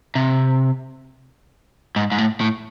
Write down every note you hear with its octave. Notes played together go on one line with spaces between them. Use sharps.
C3
G#2
G#2
A2
A2